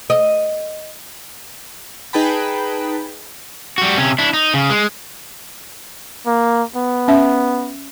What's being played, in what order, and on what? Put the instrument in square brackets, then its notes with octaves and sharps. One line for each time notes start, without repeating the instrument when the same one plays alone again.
[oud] D#5
[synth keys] D#4 G#4 B4 G5 A5 B5
[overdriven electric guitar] G3 F#4
C3 C#4
D4 E4
D#4
C#3
G#3
[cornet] A#3
B3
[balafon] C#4 E5